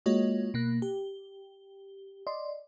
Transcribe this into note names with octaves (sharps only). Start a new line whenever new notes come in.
G#3 A#3 F4 F#4 C#5 D#5
B2 A#3 F#6
G4
D5 D#5 C6